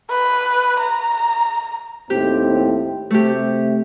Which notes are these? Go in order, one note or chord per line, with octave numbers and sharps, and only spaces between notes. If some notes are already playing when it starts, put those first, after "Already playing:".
B4
A#5
D#2 A2 C4 G4
C3 A3 G4